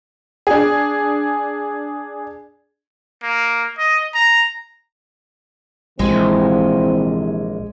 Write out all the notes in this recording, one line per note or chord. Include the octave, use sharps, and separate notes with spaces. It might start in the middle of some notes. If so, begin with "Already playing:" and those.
D4 G#4
A#3
D#5
A#5
A#1 C3 E3 G#3 C4